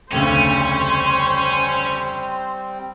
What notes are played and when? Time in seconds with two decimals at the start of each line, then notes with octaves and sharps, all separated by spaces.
0.12 F1 D2 C#3 G3 C4 C#4 C5